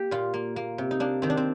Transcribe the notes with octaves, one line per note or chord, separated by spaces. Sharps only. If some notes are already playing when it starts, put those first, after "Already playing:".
Already playing: A#3 G4
A#2 F4
A#3
A#3
C3
D#4
A#3 D4
D#3 C4
D4
C4